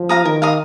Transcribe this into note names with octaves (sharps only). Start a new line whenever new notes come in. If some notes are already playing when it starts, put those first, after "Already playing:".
Already playing: F3
F5 A#5 D#6
D#3 A#4
F5 A#5 D#6